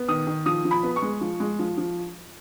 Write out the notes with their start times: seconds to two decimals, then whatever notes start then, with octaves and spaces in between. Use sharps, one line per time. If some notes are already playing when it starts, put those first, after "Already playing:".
Already playing: B3
0.08 D#3 D#6
0.27 D#3
0.46 F3 D#6
0.65 F3
0.71 B5
0.83 B3
0.96 C#6
1.02 G#3
1.21 F3
1.40 G#3
1.59 F3
1.78 F3